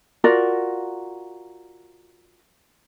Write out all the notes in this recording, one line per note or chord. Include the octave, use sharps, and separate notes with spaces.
F4 F#4 A#4 D5